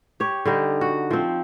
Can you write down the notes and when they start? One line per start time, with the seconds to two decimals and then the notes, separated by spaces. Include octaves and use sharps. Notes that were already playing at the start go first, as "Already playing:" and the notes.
0.20 G4 C#5
0.45 D3 G3 D#4
0.81 F#4
1.11 F3 C4